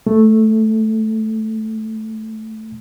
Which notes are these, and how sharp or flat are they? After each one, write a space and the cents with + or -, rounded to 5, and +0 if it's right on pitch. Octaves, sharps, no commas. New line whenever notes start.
A3 -5